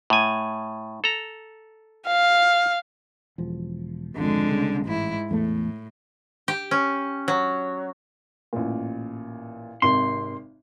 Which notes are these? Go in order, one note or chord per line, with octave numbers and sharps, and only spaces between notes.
A2 G#5
A4 A#5
F5
E1 F3
G#1 F2 D3 G#3
C2 C#3
A1 G#2 E4
E2 A2 A3
G4
C#4
F#3
A1 A#2
G#1 C3 C6